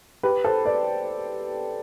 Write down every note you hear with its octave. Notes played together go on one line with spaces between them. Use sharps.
G4 B4
A4 C5
B4 D5